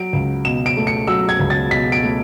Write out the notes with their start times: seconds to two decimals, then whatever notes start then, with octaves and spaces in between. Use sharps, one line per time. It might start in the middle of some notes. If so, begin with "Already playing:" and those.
Already playing: F#3 D7
0.13 C#2
0.45 B2 E7
0.66 D7
0.77 A3
0.87 C#7
1.07 F#3 E6
1.29 G#6
1.40 C#2
1.50 A6
1.71 B2 B6
1.92 D7
2.03 A3